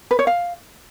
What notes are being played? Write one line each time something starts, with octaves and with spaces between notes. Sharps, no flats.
B4
C#5
F5